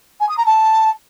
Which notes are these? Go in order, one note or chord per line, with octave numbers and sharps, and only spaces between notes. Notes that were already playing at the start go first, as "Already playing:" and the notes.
G#5
D#6
A#5
A5